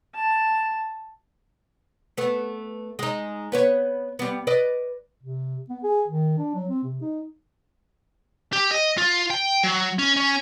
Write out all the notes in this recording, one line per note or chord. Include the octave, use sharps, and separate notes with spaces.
A5
A3 B3
G#3 D#4
B3 B4 C#5
G3 B3
B4 D5 D#5
C3
B3
G#4
D#3
D4
F#3
C4
C3
D#4
G4
D#5
F4
G5
F#3
C#4
C#4